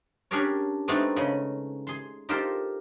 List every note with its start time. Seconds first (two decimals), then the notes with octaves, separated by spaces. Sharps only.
0.31 C#4 D4 G4 G#4 A#4 C#5
0.88 G#3 A3 B3 C4 D4 D#4
1.16 C#3 D#5
1.87 G#4 C6
2.29 D#4 F4 G4 A4 A#4 C5